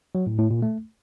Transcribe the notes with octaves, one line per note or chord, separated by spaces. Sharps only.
F#3
A2
A2
A#2
A3